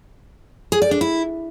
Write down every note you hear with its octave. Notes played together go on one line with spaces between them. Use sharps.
G#4
D5
D4
E4